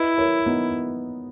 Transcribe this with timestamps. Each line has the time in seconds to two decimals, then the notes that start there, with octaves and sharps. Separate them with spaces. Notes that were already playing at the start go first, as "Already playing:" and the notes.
Already playing: E4 B4 D#5
0.18 A#4 C#5
0.46 B3 D#4